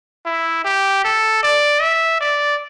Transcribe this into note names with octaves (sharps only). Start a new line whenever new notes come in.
E4
G4
A4
D5
E5
D5